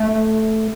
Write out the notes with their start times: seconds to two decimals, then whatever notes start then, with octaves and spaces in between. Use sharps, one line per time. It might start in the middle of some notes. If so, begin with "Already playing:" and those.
Already playing: A3